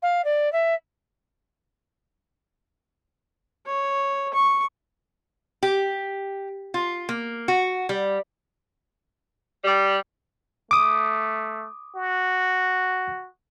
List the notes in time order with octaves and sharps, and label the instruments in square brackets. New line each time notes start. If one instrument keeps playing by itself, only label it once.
[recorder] F5
D5
E5
[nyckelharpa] C#5
C#6
[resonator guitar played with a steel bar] G4
F4
A#3
F#4
G3
[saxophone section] G3
[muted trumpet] A3 [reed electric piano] D6 D#6
[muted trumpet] F#4